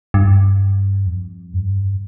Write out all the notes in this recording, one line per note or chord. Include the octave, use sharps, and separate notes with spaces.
G2
F2
G2